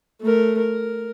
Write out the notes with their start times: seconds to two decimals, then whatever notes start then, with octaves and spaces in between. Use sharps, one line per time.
0.21 A3 A#4
0.58 A#4